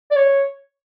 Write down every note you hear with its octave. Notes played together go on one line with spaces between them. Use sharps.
D5
C#5